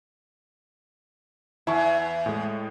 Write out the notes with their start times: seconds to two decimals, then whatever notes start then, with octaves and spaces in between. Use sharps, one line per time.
1.67 E2 E4 A5 C#6
2.26 A2 G#3